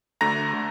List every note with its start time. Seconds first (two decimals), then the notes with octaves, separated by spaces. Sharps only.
0.21 D2 D3 A3 A#5 A#6
0.53 D3 A3